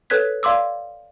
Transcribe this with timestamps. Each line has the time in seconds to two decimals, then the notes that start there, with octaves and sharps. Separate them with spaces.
0.10 A4 B4 C#5 F#6 G#6 B6
0.43 D5 F5 C6 D6 E6